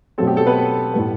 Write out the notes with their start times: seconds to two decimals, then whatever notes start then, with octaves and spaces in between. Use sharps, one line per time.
0.18 B2 F#3 A3 C4 A4
0.27 G4
0.37 A4
0.47 B3 B4
0.94 A2 G3 B3